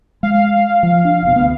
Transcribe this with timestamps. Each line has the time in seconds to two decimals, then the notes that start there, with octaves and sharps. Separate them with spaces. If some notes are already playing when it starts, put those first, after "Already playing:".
0.23 G#3 F5
0.83 F3
1.05 D4
1.23 F1 B2
1.36 D2 B3